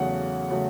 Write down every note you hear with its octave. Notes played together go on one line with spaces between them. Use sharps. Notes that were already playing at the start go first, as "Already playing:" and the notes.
Already playing: E2 C#3 F#3 A3 F#5
C#3 F#3 A3